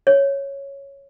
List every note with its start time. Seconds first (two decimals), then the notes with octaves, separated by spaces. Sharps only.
0.07 C#5